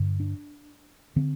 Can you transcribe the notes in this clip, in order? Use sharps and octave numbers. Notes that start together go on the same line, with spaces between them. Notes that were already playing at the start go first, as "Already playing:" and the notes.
Already playing: G2 D3
D4
D3 C4